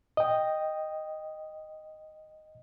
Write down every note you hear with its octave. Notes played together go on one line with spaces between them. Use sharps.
D#5 G5